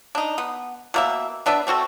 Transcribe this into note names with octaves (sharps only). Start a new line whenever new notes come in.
D4 D#4
B3
B2 A#3 E5
B3 D4 B4 E5
A3 C4 F#4 A4